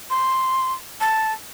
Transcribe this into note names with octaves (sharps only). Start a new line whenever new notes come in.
C6
A5